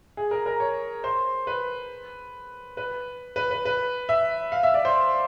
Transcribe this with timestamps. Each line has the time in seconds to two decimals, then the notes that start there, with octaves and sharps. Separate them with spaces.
0.17 G#4
0.31 A#4
0.46 A#4
0.60 C#5
1.04 C5
1.47 B4
2.77 B4
3.36 B4
3.51 B4
3.65 B4
4.09 E5
4.52 F5
4.63 E5
4.74 D5
4.85 C5